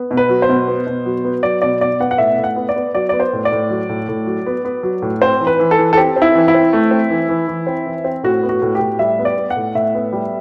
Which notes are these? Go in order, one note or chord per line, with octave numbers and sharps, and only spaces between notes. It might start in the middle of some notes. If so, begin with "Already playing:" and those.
Already playing: B3
B2
B4
F#3
C5
B2
B3
B2
F#3
B3
F#3 D5
B2 D5
B2 D5
B3 F#5
F#5
A2 E5
A2
F#5
B3
D5
B3
F#3 D5
B3 D5
C5
A2
D5
A2
F#3
A2
A2
F#3
B3
B3
F#3
A2
C4 C5
E3
B4
E3
A4
E3
A4
C4 G4
C4
E4
E3
E4
C4
A3
C4
E3
E3
E3
C4
E3
C4
A2 F#4
B3
F#4
A2
G4
A2
G3 E5
B3
D5
B3
F#5
A2
A2 E5
B3
G3